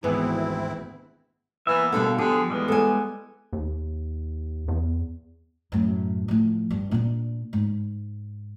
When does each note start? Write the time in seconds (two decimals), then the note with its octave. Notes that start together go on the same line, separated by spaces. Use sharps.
0.04 G#1 D2 E3 G#3 B3 C4 E4 G#4
1.67 E3 A#3 B3 E5
1.92 B2 D3 G3 F5
2.18 D3 F3 G4 G#4
2.50 E2 G3 G#3 B3
2.68 A4 G#5
3.53 D#2
4.68 E2
5.72 F#2 A2
6.28 A2 F3
6.70 G2
6.91 A#2 D4
7.53 G#2